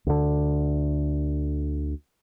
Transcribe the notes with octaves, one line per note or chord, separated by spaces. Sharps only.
D2 D3